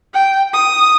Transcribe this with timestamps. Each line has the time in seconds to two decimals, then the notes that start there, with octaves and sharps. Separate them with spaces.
0.14 G5
0.53 D#6